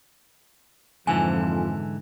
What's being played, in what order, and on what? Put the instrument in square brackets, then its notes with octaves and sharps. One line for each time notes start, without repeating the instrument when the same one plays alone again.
[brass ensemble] F2 F3 [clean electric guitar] G#2 D3 E3 [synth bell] G#5